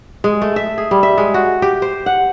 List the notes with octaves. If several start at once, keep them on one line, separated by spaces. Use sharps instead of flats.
G#3
A3
E5
G#4
G3
E5
G#3
F#4
G4
C5
F#5